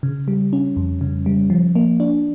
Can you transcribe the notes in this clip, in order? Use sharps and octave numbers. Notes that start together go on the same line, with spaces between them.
C#3
G3
C#4
F2
C#3
G3
F3
A#3
D4